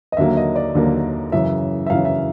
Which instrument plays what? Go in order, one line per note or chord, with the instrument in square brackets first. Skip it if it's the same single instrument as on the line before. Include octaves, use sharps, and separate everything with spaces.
[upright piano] D#5
D#2 D3 F#3 A#3 E5
D#5
D5
D#2 D3 F#3 A#3
F#2 C#3 E3 E5
E5
F#2 C#3 E3 F5
E5